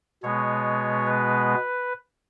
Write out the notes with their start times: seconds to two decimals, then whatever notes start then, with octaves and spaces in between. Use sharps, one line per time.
0.23 B2 G#3 B3 C#5
1.06 B4